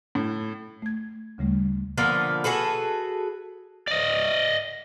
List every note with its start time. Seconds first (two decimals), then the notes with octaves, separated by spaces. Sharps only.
0.15 A2
0.82 A3 G#6
1.38 D2 C#3 G3 A3
1.97 D3 F3 A#3 B3
2.44 F#4 G#4 A4 B4
3.88 D5 D#5